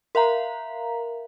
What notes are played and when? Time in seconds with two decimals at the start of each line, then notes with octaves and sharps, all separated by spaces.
0.15 A#4 E5 F5 A#5